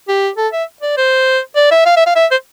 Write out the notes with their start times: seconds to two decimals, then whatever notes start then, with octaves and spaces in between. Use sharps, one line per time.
0.08 G4
0.37 A4
0.53 E5
0.82 D5
0.97 C5
1.56 D5
1.71 E5
1.86 F5
1.96 E5
2.06 F5
2.16 E5
2.31 C5